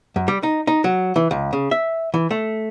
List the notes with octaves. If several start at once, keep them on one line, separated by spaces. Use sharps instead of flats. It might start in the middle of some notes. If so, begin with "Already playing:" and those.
F#2
G3
D#4
D#4
F#3
E3
C#2
C#3
E5
E3
A3